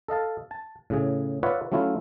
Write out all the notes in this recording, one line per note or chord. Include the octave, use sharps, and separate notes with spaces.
A4 D#5 F5 A5
A5
A2 C#3 G#4
F4 B4 C#5 D5 E5 F#5
F#3 A3 C#4 E4 F4